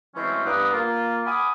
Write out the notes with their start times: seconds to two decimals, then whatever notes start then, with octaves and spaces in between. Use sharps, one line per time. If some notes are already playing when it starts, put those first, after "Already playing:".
0.15 E3 F#3 G#3 A3 C4 C#4
0.45 G2 B3 F#5 A#5 D6 D#6
0.72 A#3 F4
1.25 F#5 G#5 B5 D6 D#6 F6